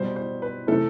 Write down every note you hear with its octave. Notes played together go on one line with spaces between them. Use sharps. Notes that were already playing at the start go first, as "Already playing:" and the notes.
Already playing: B2 G3 C5
C5
B4
C3 E3 A3 A4